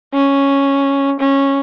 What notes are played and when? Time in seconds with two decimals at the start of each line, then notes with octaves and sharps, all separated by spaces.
0.13 C#4
1.19 C#4